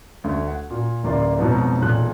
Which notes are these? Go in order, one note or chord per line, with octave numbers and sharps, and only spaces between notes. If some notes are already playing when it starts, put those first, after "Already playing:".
D2
F#5
A#2
D1 A1 A#3 D#4 D5 C6
F2 G#2 B2 F3 F#3 D#4
E1 B1 A#2 F#6